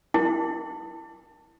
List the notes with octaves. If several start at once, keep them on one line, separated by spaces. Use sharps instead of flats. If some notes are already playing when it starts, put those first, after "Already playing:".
E4